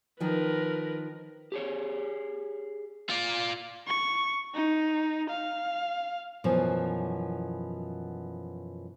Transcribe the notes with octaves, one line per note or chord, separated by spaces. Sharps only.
D#3 F3 A#4 B4
G4 G#4 C#5
F4 D5
C#6
D#4
F5
F#2 B2 E3 F3